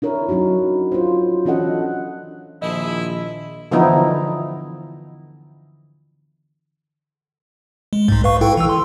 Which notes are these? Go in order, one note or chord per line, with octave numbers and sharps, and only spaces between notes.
D4 E4 A#4 C#5
F#3 C#4 D#4 F#4
F4 C5
E3 C#4 D4 A4 D#5 F#5
A#1 D#3 F3 E4 G#4 D#5
D3 E3 F3 B3 D#4 E4
G#3
B1 G#2
B4 F5 C#6
E4 A4 G5
E3 E6
C6